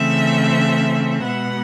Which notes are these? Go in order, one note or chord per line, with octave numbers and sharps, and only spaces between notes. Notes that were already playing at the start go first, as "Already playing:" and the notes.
Already playing: C#3 E3 A3 C4 E5
B2 G#3 B3 F#5